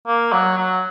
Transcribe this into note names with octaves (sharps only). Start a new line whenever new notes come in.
A#3
F#3
F#3